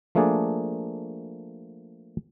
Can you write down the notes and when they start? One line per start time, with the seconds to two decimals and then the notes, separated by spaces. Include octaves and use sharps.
0.15 F3 A3 A#3 D4 G#4 D5